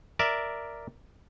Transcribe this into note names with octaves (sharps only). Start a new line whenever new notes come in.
A#4 D5 E5